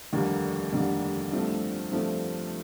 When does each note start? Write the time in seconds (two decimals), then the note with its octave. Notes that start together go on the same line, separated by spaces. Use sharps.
0.13 F1 D#2 D3 G3 A#3
0.73 F1 D#2 D3 G3 A#3
1.32 G2 F3 A3 C4
1.91 G2 F3 A3 C4